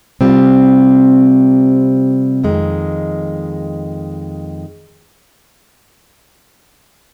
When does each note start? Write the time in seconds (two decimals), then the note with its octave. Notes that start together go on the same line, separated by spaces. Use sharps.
0.21 C3 G3 C4 F4
2.43 F2 D#3 G#3